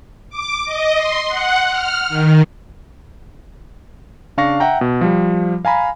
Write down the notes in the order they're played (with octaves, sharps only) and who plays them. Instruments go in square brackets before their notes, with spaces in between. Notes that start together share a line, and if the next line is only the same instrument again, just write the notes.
[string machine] D6
D#5
C6
F#5
F6
D#3
[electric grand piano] C#3 D4 F5 C#6 A#6
E5 F#5 G5 A#5
B2
F3 G3
F5 G#5 A#5 B5